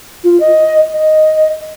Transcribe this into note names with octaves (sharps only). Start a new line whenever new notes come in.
F4
D#5
D#5